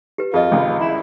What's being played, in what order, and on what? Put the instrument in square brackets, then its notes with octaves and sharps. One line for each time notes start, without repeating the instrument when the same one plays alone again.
[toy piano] G4 B4
[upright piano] F2 [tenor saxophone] F4 [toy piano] G#4 D#5
[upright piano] G#1 C#2 [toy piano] G5
[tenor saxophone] E4